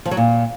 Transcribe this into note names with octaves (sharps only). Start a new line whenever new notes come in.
F3
F#3
A#2